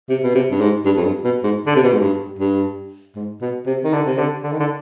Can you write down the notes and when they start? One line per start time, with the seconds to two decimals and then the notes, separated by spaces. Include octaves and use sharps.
0.09 C3
0.23 B2
0.35 C3
0.51 G2
0.61 G#2
0.85 G2
0.97 F2
1.05 G2
1.24 B2
1.44 G#2
1.66 D3
1.76 C3
1.84 B2
1.93 G#2
2.00 G2
2.39 G2
3.16 G#2
3.42 B2
3.66 C3
3.84 D#3
3.93 D3
4.07 C3
4.18 D3
4.43 D3
4.52 D#3
4.60 D3